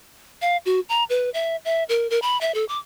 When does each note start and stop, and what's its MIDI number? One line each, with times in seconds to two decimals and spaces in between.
0.42 0.57 77
0.66 0.80 66
0.89 1.04 82
1.10 1.30 71
1.34 1.56 76
1.65 1.84 76
1.89 2.09 70
2.10 2.21 70
2.22 2.39 83
2.41 2.54 76
2.54 2.65 69
2.69 2.79 86